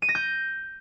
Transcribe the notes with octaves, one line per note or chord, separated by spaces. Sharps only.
D#7
A#6
G6